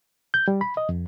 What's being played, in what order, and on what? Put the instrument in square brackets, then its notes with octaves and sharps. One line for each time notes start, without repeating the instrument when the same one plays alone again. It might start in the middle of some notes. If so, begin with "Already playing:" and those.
[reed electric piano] G6
G3
B5
D#5
F2